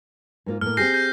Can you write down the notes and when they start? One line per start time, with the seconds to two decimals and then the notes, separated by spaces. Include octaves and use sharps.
0.46 G#2 A#3 F4
0.61 A2 A#3 F6
0.77 C4 G4 G#4 G6 A#6 C7
0.94 G6